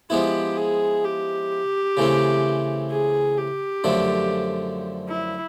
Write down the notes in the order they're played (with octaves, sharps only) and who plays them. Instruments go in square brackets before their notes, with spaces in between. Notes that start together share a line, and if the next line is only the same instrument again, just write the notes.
[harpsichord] F3 G#3 B3 E4 [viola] G4
[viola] G#4
G4
[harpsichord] C#3 E3 A3 C4
[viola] G#4
G4
[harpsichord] F#2 D3 F3 A3
[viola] E4